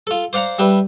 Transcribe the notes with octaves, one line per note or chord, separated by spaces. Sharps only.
F4 A4
C5 D5 F5 F#5 A#5
G3 D4 G4 B4 E5